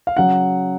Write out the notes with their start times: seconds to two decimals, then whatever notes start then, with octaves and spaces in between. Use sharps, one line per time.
0.07 F5
0.17 C#3 F#3 F#5